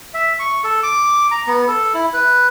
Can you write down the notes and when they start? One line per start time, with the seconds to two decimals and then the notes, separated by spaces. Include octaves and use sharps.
0.14 E5
0.39 C#6
0.64 A4
0.83 D6
1.31 A#5
1.47 B3
1.68 A4
1.94 E4
2.14 B4